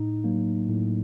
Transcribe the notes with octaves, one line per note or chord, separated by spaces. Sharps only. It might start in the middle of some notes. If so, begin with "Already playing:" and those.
Already playing: A2 D#4
F#3 A#3
A2